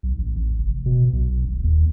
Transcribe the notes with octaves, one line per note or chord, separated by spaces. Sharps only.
B1
A1
A1
F1
B2
B1
D#1
D#2